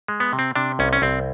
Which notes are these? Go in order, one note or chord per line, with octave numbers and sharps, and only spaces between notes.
G#3
B3
C3
C4
C3 D4
C2 C#4
C#4
C2 C4